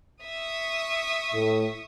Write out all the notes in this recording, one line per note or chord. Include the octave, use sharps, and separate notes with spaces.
E5 C#6 D#6
A2